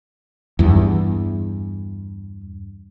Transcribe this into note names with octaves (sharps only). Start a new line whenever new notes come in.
E2 G2